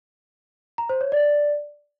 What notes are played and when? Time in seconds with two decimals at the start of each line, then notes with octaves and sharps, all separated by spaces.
0.78 A#5
0.89 C5
1.01 C#5
1.12 D5